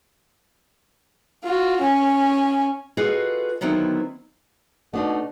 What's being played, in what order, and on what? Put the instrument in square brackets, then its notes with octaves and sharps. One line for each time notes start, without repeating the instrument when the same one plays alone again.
[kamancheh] F4 F#4
C#4 G#5
[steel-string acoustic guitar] F4 F#4 G#4 A4 B4 D#5
D3 D#3 F#3 B3 C4 E4
[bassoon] B2 [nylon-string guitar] A3 D4 D#4